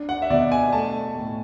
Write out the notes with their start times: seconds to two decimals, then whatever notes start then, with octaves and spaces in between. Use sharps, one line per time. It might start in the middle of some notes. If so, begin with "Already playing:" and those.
Already playing: D4
0.09 F#5
0.22 E5
0.30 B2 D5
0.52 G#5
0.72 A3 A5
1.15 A2